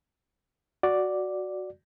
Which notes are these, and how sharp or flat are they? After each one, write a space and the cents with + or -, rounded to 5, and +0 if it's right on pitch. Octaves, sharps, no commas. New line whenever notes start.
F#4 +0 D5 +0